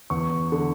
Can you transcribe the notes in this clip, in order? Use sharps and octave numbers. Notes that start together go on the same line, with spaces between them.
E2 C#6
D3